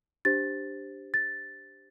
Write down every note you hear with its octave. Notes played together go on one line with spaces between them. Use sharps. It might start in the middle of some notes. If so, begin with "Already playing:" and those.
D4 G4 C5 A6
A6